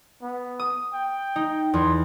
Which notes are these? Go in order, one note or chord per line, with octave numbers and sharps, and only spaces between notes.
B3
D#6
G5
D#4
E2 C6